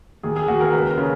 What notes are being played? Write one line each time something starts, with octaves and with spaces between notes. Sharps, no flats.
D#2 G#4
G#4
D#2 F#4
A#4
C#2 B4
A#4
C#3